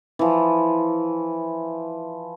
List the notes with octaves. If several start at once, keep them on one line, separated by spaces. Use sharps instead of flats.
E3 F3